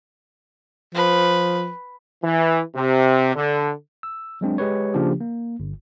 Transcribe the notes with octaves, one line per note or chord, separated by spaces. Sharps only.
F3 B4
E3
C3
D3
E6
F#3 G#3 C4 D4
G#3 G4 B4 C#5
C#3 F3 A#3 D4 G4
A#3
G1